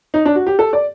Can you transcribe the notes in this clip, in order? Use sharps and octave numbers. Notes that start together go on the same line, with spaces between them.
D#4
D4
F#4
G4
A4
D5